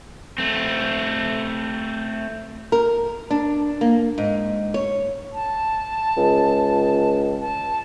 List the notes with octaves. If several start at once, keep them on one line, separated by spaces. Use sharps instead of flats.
A3 C4
A#4
D4
A#3
G#2
C#5
A5
C#2
A5